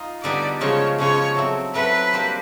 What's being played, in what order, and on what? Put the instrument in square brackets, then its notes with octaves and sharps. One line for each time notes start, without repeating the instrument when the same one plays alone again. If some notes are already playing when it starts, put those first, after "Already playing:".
Already playing: [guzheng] D#4 F4
[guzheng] D3 G3 B3 D#4 [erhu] D5
[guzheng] C#3 F3 G#3 [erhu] C#5
[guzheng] C#3 F3 G#3 [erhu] C#5
[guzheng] F#3 A3 C4
[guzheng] F#3 A3 C4 [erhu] B4
[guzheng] G3 A#3 D4 G4 C5